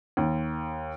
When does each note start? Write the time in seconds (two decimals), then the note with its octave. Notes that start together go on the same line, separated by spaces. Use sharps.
0.17 D#2